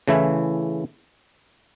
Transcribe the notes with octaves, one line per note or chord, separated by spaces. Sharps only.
C#3 E3 A3 E4